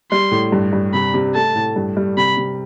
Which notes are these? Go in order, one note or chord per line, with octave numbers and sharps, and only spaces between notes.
G3 C6
A2
G2
G2
C3 B5
C3
A3 A5
A2
G2
G3
C3 B5
C3